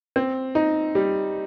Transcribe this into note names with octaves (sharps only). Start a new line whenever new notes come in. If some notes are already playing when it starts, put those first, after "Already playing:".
C4
D#4
G3